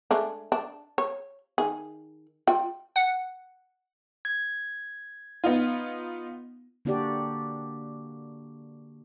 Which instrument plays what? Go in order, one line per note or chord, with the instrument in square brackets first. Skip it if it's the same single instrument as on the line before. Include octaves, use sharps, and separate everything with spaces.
[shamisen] G#3 A3 D4
D4
C#5
D#3 G#4
F4 G5
[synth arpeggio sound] F#5
[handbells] G#6
[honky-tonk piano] B3 D#4 F4
[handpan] D3 A#3 D4 F#4 G4 D5